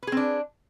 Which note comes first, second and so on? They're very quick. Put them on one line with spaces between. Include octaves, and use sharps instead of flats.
B4 G#4 C4 D4